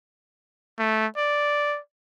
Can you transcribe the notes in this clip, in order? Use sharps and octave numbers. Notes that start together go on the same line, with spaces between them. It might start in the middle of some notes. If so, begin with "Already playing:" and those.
A3
D5